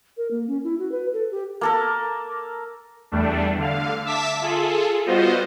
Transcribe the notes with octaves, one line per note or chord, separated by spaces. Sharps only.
A#4
A#3
C#4
E4
F#4
B4
A4
G4
A#3 A4 A#4
E2 G3 A3 D4
D3 F5
E5 A5 D6 E6 B6
F4 G#4 A4
G3 B3 F4 F#4 C5 D#5